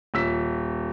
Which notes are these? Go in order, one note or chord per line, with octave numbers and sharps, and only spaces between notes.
D#1 E6 B6